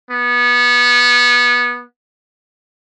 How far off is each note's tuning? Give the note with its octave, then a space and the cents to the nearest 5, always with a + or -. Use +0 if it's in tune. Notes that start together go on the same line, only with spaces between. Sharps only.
B3 -20